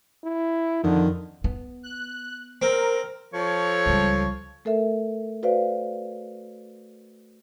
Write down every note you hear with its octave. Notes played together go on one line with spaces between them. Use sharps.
E4
F2 D3 D#3
B3
F#6
C4 A#4
F3 A4 C#5
C#2 G3
A3 A4 A#4 E5
F#4 B4 C5 D5 F5